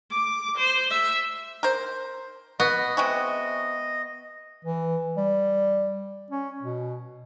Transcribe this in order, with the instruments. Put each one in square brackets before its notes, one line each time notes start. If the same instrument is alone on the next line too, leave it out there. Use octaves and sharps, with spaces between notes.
[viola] D6
C5
E5
[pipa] A#4 C5
[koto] B3 [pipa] F#4 [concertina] D#5
[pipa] C3 G#3 F#4
[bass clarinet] E3
G3
C#4
B2